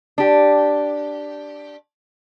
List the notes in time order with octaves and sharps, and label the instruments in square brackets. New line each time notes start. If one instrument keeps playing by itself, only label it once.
[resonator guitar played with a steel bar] D4 G4